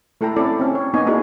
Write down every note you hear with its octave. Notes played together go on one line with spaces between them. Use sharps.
A3 E4 A4 G5 A#5
C4 C#4 E4 A4 D5
C4 C#4
C#5
A#3 B3 D#4 C#5 D#5 G#5
A#3 D4 E4 F#4 G#4 A#4